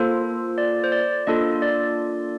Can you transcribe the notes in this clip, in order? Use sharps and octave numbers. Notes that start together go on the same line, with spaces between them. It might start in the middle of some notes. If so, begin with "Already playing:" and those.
Already playing: A#3 F4 A4 C5
D5
C5
D5
A#3 D4 F4 A4 D#5
D5